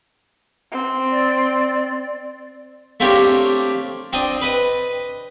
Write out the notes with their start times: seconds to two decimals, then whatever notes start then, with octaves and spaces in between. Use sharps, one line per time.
0.72 C4
1.11 D5
3.00 A3 A#3 C4 D4 G4 C#5
4.13 C4 D4 D#5
4.42 B4 D#5